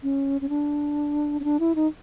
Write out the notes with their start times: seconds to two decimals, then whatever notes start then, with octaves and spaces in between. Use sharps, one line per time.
0.03 C#4
0.41 C#4
0.49 D4
1.40 C#4
1.44 D4
1.60 E4
1.75 D#4